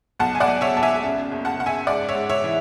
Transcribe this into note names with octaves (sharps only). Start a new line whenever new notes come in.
B1 F#5 A5
G#5
D5 F#5
B1
C#5 E5
B1 A5
E5 G#5
C#3
F#1
F#5 A5
C#3 F#5
E5 G#5
G#2 D5 F#5
C#5 E5
G#2
C#5 E5
E3